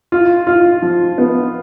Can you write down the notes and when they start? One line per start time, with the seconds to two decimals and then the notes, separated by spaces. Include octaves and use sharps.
0.12 F4
0.47 F4
0.82 F3
1.18 B3